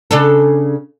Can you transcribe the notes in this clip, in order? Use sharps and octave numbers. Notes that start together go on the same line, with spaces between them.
C#3 D4 A4